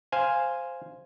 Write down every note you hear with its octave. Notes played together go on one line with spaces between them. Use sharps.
C5 F5 G#5